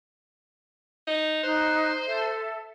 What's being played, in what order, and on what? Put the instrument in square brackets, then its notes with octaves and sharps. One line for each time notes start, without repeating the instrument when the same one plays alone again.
[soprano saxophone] D#4
[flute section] D#4 F#6 [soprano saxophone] C5
[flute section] A4 E5